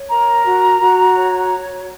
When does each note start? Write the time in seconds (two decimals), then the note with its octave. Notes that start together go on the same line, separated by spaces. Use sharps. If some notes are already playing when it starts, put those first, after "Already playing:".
Already playing: C#5
0.10 A#4 A#5
0.45 F#4
0.81 F#4
1.16 C#5